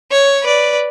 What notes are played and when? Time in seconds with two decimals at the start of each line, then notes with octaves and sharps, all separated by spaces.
0.11 C#5
0.43 B4 D5